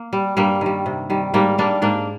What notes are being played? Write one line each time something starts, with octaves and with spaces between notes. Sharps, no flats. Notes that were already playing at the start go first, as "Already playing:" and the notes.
Already playing: A#3
G3
G2 G3 A#3
D#3 G3
C3
D#3 G3
G#2 G3 A#3
G3 A#3 D4
G#2 A#3 D4